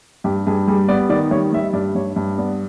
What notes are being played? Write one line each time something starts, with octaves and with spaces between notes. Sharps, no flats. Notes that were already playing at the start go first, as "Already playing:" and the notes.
G2 G4
G2 G#4
G3 G#4
B3 D5
D#3 D5
G3 C#5
G3 E5
D#5
G2 D5
G2 C#5
G2
B3 D5